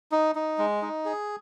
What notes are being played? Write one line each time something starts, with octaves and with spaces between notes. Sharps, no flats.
D#4
D#4
G#3
D#4
G#4